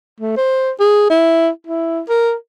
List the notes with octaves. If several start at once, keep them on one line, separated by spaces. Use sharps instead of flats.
A3
C5
G#4
E4
E4
A#4